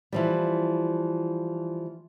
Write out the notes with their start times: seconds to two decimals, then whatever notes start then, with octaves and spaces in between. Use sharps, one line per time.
0.12 E3 F3 G3